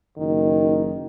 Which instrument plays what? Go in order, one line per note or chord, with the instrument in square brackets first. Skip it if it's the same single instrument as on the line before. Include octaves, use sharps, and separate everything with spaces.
[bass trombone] F#1 [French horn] D#3